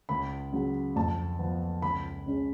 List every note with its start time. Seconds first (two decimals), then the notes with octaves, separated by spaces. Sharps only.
0.09 C#2 B5
0.53 C#3 F#3
0.96 F2 A5
1.39 F3 B3
1.82 C#2 B5
2.26 C#3 G#3 C#4